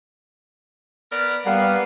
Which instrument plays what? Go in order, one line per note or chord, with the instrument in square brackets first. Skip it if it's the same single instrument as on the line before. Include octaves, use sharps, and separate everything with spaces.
[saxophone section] B3 A#4 D5
[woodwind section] G3 F5 F#5 [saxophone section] A#3 B3